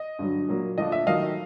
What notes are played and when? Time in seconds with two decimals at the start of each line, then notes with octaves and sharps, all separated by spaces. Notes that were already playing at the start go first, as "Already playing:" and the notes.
Already playing: D#5
0.19 G2 D3 F#3
0.48 A#2 F#3 A#3
0.78 D3 F3 A3 D4 F4 D#5
0.92 E5
1.07 D#3 F#3 A3 D#5 F5